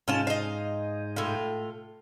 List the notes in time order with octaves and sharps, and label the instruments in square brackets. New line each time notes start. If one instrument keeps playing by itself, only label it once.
[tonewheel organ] G#2 G#3 D#4 [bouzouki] C#4 F4 A5
[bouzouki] D#5 F5
A2 F4